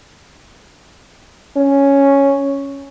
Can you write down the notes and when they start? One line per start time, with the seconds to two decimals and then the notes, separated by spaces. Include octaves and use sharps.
1.57 C#4